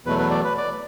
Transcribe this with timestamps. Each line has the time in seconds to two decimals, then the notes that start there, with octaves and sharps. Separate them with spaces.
0.05 E2 B2 F#3 A3 B4
0.19 B4
0.31 D5
0.45 B4
0.58 D5